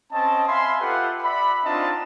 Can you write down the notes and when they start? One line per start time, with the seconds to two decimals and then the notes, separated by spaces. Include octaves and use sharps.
0.12 C4 C#4 D#5 A5
0.47 E5 F5 G#5 B5 C6
0.80 F4 G4 A4 B4 E5 F#5
1.22 D5 E5 F#5 B5
1.65 C4 D4 D#4 F4 D#5 A5